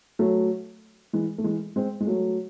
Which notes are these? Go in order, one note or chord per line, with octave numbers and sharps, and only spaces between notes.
F#3 A3
E3 G#3
A3
E3 G#3
G#3 C4
G#3
F#3 A3